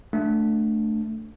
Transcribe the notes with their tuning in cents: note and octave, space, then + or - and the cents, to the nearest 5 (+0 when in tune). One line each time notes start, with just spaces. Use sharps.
A3 +0 D4 +0